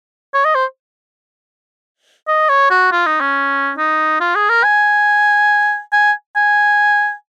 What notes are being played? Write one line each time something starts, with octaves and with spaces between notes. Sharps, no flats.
C#5
D#5
C5
D#5
C#5
F#4
F4
D#4
C#4
D#4
F4
G#4
A#4
G#5
G#5
G#5